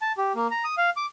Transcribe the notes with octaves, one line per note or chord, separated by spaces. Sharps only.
A5
G4
A#3
A#5
D#6
F5
D6